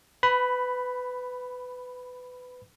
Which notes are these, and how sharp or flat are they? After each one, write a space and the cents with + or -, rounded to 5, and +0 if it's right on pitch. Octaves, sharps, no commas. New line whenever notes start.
B4 +20 B5 +0